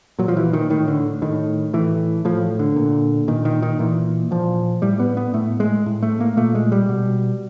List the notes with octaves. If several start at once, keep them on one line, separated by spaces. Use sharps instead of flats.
A#2 F#3
F3
E3
D#3
A2 D#3
D3
A2 D#3
A2 E3
A2 F3
D3
A#2
A#2 D#3
D#3
D#3
A#2 E3
A#2 F3
A2 G3
B3
B3
A2 A3
G#3
A2
A3
A#3
A#2 A3
G#3
G3
B2